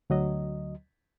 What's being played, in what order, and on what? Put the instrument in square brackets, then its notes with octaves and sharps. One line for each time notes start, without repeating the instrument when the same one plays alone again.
[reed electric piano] D2 F#3 D#5